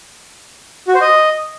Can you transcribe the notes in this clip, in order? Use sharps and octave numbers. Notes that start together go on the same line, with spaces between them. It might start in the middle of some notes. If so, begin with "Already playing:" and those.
F#4
C5
D#5